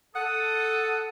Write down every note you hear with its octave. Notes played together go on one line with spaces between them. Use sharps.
A4 F#5 D#6